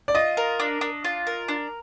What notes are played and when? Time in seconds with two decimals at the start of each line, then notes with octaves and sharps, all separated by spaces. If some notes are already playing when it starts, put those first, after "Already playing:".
0.08 D5
0.15 F4 D#5
0.37 A#4
0.60 D4
0.81 D4
1.04 F4
1.27 A#4
1.48 D4